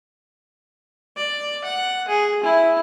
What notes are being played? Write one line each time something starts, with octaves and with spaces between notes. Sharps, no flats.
D5
F#5
G#4
E4